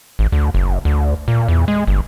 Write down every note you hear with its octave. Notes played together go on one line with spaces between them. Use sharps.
G#1
D2
F#1
D2
A#2
E2
G#3
G1